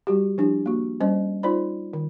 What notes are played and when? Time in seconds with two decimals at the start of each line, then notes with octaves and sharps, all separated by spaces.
0.07 G3 F#4 G4
0.38 F3 D4 E4 G4
0.66 A#3 F#4
1.00 G3 C#4 C5 D#5
1.43 D#4 F4 C5 D5 B5
1.93 D#3